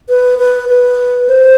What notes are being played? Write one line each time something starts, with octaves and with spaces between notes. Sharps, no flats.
B4
B4
B4
C5